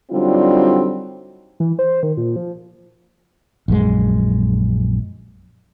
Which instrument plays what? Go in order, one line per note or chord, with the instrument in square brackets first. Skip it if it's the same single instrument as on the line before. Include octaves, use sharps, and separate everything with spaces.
[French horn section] D3 F#3 G3 C4 D#4 F4
[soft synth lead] E3
C5
D#3
A#2
F3
[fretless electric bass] A#1 F#2 G#3